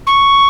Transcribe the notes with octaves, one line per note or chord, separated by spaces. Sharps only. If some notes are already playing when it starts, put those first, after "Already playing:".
C#6